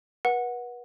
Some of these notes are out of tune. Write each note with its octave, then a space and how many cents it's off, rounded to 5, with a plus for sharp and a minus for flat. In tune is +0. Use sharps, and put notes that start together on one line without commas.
B4 -35 F#5 -10